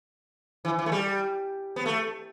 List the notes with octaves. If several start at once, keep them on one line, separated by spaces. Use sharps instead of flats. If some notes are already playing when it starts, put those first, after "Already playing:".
E3
E3
A3
G3
B3
A3